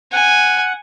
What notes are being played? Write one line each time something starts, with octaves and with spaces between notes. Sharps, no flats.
F#5 G#5